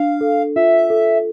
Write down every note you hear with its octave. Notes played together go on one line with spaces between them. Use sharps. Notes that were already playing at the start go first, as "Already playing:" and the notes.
Already playing: D4 F5
A4
F4 E5
A4